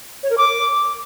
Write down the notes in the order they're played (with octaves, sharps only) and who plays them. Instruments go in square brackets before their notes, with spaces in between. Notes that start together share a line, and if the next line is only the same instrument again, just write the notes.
[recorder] C#5
A#4
D6